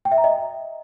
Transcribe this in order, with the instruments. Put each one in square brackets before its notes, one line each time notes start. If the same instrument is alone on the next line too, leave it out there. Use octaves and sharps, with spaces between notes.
[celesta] G5
E5
A#5
D#5